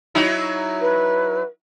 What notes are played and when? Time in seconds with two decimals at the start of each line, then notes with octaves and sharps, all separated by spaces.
0.15 F#3 D#4 E4
0.81 B4